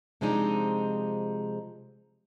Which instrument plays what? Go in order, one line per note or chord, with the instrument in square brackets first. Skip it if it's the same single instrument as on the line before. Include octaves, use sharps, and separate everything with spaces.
[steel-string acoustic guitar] C3 F3 G#3 C4 D4 D#4